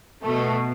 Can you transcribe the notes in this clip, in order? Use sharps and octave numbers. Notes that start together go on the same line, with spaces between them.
B2 A3